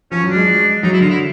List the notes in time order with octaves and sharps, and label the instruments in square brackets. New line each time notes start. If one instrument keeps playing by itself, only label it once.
[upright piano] F3 [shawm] C#4
[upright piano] F#3
[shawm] D4
[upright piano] G#3
[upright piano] F#3 [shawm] D#4
[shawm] E4
[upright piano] D3 [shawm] F4
[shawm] E4